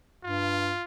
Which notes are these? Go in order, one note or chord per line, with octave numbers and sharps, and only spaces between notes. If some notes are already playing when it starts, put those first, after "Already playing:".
G2 F4